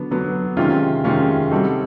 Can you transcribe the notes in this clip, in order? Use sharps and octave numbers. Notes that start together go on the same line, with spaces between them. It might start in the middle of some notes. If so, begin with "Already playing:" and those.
Already playing: D3 F#3 B3 D4
D3 F#3 B3 D4
C3 D#3 G#3 C#4 F4
C3 D#3 G#3 C#4 F4
G3 C4 D#4 F#4 A4